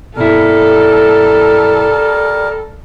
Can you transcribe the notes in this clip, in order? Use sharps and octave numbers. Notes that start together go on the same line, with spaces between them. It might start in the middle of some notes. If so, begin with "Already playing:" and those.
B1 G2 G3 E4 A4 A#4